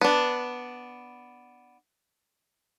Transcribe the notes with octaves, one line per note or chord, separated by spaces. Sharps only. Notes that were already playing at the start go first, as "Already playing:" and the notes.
B3 D4